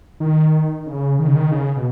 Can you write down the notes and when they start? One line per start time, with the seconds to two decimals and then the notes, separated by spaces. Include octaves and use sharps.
0.20 D#3
0.86 C#3
1.19 D#3
1.27 C#3
1.36 D#3
1.51 C#3
1.76 B2